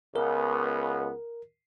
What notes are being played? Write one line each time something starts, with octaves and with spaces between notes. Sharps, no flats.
C#2 B3 A#4